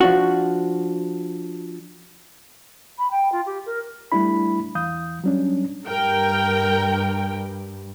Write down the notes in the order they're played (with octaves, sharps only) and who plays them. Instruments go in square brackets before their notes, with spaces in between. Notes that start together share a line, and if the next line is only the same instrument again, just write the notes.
[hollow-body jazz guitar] F3 D4 F#4
[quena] B5
G5
F4
G4
A#4
[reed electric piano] G3 A3 D4 E4 B5
E2 E3 F5 D#6 G6
F#3 G3 C#4 D4
[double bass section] G2 [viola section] A#4 G5